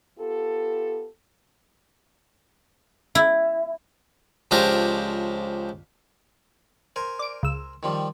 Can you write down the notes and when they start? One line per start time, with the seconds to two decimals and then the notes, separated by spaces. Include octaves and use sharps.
0.19 B3 F4 G4 A4
3.15 E4
4.51 C#2 F3 D4 G4 A#4 C5
6.96 A#4 C5 G#5
7.19 D5 D7
7.43 C#2 E6
7.83 D#3 F3 G3